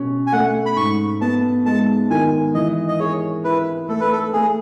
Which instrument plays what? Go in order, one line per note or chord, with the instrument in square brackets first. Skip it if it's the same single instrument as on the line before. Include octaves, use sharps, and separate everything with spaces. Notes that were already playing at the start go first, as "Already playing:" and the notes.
Already playing: [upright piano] B2 C#4
[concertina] G#5
[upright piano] A3 [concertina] F#5
[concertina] B5
[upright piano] G#2 [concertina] C#6
[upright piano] B3 [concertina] A5
[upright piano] G#3 [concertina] A5
[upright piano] D#3 [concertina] G#5
[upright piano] E3 [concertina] D#5
[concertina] D#5
[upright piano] G#4 [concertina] C#5
[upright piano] E4 [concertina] B4
[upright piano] A3 [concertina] A4
[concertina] B4
A4
[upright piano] A3 [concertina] G#4